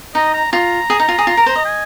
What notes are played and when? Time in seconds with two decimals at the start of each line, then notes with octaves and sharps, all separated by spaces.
0.15 D#4 D#5
0.34 A#5
0.53 F4 A#5
0.90 G#4
1.00 D#4
1.09 F4
1.18 G#4
1.27 F4
1.37 A#4
1.46 C5
1.55 D#5
1.65 G#5